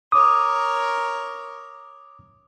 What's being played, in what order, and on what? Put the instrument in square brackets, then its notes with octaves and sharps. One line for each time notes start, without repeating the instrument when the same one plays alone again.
[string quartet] A#4 C#5 [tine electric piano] D6 D#6